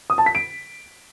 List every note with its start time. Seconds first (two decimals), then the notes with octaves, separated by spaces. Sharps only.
0.10 D#6
0.18 A5
0.26 B6
0.35 D7